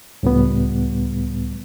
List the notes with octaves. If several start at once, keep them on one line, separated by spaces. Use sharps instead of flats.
C#2 A2 G3 B3